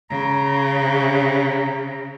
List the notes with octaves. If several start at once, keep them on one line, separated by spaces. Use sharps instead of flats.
C#3 A#5